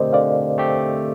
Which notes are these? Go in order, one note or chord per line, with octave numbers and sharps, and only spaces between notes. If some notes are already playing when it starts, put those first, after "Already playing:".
Already playing: D3 A3 C4 G4 A#4 C5 D5 D#5
D3 D5 F5
A3 C4 G4